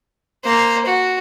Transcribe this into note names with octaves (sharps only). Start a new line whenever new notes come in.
A#3 C5
F#4